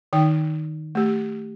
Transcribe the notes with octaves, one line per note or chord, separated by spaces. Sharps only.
D#3 D#4 G5
A3 G4